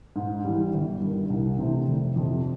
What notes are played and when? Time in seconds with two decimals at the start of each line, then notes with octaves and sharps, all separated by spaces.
0.16 G#2
0.45 E3 G3
0.73 G1
1.01 G2
1.06 D#3
1.30 C2
1.58 C3 E3 A3 C4
1.88 F1
2.16 F2 C3